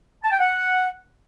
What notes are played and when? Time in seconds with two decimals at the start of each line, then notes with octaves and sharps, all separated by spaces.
0.23 A5
0.31 G5
0.39 F#5